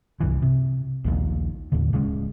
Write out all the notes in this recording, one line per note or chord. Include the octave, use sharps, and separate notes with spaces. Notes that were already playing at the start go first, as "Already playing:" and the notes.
C2 G2 E3
C3
A#1 D#2 A#2 D#3
D#2 A2 D3
D1 C#3 G#3